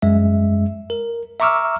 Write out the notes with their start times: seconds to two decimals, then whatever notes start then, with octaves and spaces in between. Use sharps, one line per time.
0.02 F#2 G#3 E5
0.90 A#4
1.40 E5 A#5 C#6 D6 E6 F6